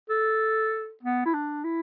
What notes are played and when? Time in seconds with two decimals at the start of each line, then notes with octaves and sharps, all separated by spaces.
0.10 A4
1.03 B3
1.25 E4
1.34 D4
1.64 E4